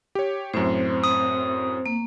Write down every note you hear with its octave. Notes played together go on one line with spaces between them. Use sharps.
G4 C#5
F#2 A2 C4 C5
D#6
A#3